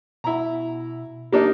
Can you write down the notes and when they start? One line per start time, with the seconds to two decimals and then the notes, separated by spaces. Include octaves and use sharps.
0.24 B2 E4 A#5
1.32 A#3 D4 D#4 G4